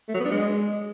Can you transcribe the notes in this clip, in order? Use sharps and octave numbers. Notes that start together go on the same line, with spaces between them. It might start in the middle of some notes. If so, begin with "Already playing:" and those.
A3
F#3
B3
D4
G#3